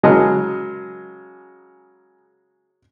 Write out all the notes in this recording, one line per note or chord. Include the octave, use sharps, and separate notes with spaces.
C#3 F#3 G#3 A#4 D#5 A5